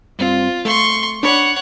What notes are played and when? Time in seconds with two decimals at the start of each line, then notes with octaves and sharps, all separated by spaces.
0.19 G2 C4 F4
0.65 A3 C6 C#6
1.23 D4 C#5 F#5 B5